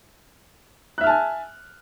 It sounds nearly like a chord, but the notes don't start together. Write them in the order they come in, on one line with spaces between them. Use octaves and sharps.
F#6 E5 F6 A5 G#5